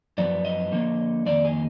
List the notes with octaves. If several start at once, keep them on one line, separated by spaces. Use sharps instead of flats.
F#2 F3 B3 D5
D#5
D3 F3 A#3
F2 D#3 A#3 D5
G#4